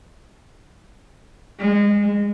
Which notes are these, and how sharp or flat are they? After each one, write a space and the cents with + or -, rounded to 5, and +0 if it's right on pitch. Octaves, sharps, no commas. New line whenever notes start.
G#3 -25